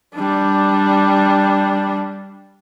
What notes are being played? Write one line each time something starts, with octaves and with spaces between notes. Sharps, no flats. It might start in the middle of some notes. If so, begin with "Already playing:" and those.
G3 D4